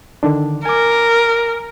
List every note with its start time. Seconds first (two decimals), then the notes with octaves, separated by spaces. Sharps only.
0.23 D3 D#3 D4
0.65 A#4 G#5 D6